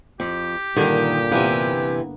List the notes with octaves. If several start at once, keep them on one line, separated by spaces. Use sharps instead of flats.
F2 G4
G2 A#2 D3 D#3 A#4
C3 E3 A#3 B3